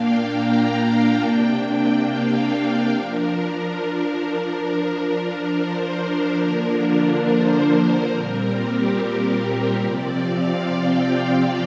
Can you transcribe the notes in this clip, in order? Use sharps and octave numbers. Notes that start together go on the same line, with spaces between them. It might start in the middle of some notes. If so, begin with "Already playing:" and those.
Already playing: A#2 A#3 D4 F5 G5
A#5
G5
C3 A#3 D4
F5
F3 D4 A#4
F3 D4
C5
D3 F3 A#3 D4 A#4
A#4
C5
A#2 G3 C4 A#4
G4
G4
A#4
C3 F3 C4 D5
F5
G5